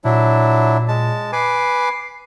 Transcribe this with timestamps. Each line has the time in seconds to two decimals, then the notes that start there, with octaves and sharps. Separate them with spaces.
0.05 A#2 F#3 D4 E4
0.88 G#3 A5
1.33 B4 G#5 D6 C7